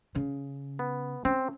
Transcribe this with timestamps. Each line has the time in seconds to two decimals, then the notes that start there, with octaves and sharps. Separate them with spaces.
0.15 C#3
0.79 B3
1.25 C4 C#4